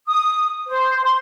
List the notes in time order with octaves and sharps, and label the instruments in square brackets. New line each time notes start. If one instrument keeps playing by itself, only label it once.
[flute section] D#6
C5
C6